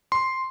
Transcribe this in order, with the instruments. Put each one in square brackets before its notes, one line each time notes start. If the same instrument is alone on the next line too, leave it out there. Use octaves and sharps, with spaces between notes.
[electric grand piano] C6